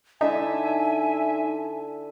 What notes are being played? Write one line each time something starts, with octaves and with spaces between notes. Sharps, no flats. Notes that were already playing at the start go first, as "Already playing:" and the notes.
D3 D#4 E4 E5 G#5 A5